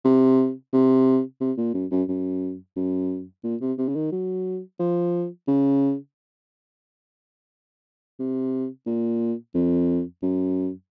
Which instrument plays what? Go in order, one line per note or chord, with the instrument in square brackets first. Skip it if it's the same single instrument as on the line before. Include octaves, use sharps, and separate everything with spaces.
[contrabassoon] C3
C3
C3
A#2
F#2
F#2
F#2
F#2
A#2
C3
C3
C#3
D#3
F#3
F3
C#3
C3
A#2
F2
F#2